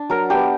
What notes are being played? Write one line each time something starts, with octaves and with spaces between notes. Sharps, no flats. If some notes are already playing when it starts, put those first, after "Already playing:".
Already playing: D4
F#3 A#4
B3 D4 G4